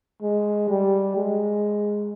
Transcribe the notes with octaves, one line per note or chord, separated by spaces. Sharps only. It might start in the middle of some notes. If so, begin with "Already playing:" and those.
G#3
G3
G#3